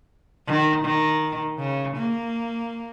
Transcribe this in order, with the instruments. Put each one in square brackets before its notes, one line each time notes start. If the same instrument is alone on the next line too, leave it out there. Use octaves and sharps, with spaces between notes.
[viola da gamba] D#3
D#3
C#3
A#3